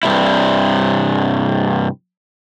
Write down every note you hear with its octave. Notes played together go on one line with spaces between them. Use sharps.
G2 C3 E4